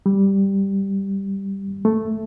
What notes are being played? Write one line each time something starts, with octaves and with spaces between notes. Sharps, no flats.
G3
A3